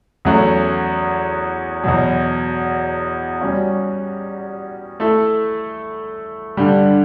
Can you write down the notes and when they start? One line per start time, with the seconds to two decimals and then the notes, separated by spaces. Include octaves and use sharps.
0.25 E2 C#3 F#3 A3
1.84 E2 B2 F#3
3.41 G3 C#4 F#4
5.00 A3 E4 A4 E5
6.57 G2 D3 G3